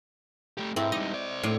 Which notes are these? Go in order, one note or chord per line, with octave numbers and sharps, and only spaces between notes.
A3 G4
G#2 G#3 C4 E4 A4
G3 D#4 D#5
C5 D5
A2